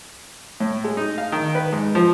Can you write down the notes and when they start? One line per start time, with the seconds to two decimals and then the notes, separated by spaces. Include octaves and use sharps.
0.60 A2
0.84 G#3
0.97 D#4
1.18 F5
1.32 D#3
1.55 B4
1.72 G#2
1.95 F3